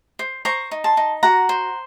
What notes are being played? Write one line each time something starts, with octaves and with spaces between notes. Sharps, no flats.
C5
C5 A#5 C#6
D#4
A5 C6
D#4
F#4 F#5 A#5
C5